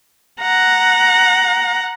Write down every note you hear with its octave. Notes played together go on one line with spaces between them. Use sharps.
F#5 A#5